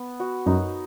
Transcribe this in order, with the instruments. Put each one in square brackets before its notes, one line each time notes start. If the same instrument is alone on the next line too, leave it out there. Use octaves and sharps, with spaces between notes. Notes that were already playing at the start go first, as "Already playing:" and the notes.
Already playing: [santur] B3
F#4
[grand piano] F#2 [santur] D#4